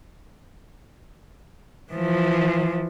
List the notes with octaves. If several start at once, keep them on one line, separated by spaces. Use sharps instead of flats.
E3 F3